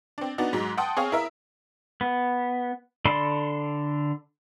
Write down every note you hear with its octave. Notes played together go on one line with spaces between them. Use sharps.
C4 D4
B3 D4 D#4 F#4
G#2 F#3 G#3
F#5 G5 A5 C6 D#6
C4 G#4 C#5 F5
E4 A#4 E5
B3
D3 A4 D5 B5 C6